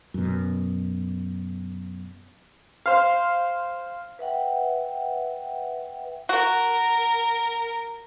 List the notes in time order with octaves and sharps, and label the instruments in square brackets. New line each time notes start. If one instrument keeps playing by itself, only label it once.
[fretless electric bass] F#2 B2
[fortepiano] C5 F5
[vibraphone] B4 E5 F#5 G5
[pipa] F#4 [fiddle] A#4